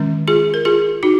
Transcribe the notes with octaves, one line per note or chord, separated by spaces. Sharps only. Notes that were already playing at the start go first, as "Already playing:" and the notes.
Already playing: D#3 G#3 C#4
F4 G#4
A#4
F4 G#4
D#4 F#4